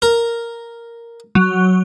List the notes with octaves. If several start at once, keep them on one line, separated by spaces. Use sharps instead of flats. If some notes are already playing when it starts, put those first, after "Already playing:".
A#4
F#3